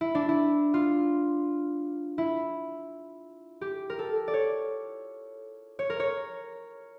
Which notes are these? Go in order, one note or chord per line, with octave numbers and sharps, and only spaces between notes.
E4
D4
E4
F4
E4
G4
A#4
A4
D5
C#5
C#5
A#4
C#5